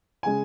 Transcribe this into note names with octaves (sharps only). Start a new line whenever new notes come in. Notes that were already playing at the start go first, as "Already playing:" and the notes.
C#3 G#3 G#5